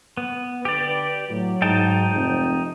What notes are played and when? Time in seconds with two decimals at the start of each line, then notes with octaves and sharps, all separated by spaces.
0.17 B3
0.65 D3 G4 B4 D5
1.30 A2 F#3
1.62 G#2 D#4 G5 A5
2.15 F1 C4